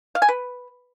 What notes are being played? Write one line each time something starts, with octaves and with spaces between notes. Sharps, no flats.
F5
G#5
B4